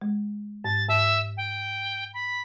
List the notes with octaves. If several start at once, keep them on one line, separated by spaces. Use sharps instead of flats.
G#3
G#2 A6
G#2 E5
G5
B5